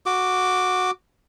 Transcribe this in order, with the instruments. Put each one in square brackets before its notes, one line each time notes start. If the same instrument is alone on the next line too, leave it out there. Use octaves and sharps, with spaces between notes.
[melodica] F#4 D6